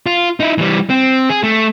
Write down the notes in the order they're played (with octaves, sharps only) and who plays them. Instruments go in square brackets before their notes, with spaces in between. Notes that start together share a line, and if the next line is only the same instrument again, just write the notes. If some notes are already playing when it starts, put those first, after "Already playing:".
[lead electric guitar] F4
D#4 E4
E3 G3
C4
G#4
A3